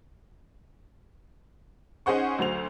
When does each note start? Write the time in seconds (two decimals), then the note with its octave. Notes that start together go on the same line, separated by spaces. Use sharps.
2.06 C#4 D#4 G#4 C5 F#5 C#6
2.39 D2 F#3 C5 F7